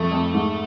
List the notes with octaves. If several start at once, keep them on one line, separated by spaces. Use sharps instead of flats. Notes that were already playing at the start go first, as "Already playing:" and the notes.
Already playing: F2 A3
F2
G#2